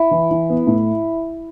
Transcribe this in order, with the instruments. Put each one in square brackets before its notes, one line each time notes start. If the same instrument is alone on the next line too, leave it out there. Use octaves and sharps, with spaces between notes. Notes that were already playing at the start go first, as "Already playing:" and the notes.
Already playing: [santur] E4
[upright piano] E3
E3
B3
A2